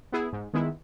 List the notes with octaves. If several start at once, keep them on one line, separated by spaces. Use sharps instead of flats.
B3 E4 G#4
G#2
D#3 G#3 B3 E4